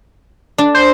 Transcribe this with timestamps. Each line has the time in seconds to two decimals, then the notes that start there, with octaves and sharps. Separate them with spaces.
0.58 D4
0.75 C5